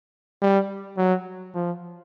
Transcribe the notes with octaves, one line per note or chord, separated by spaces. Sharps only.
G3
F#3
F3